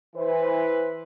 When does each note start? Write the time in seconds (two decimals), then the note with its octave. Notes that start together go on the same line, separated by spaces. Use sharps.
0.15 E3 B4 C5